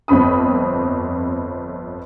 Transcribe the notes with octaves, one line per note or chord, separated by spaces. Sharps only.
G1 F2 C4 B5 D#6